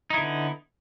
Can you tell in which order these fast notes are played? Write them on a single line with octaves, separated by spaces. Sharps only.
D#4 E4 D3 B3